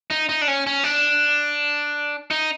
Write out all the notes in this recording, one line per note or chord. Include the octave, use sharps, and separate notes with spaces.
D#4
D#4
D4
C#4
C#4
D4
D#4